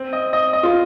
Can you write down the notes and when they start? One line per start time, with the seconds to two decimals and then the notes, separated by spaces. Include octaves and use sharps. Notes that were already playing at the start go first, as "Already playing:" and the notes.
Already playing: C4
0.13 D#5
0.33 D#5
0.53 D#5
0.63 F4